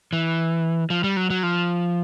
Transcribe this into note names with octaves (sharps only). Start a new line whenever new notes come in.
E3
F3
G3
F#3
F#3
F3